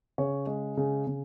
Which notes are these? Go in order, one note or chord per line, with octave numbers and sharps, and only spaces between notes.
C#3 C#5
G#3
C#3
C#3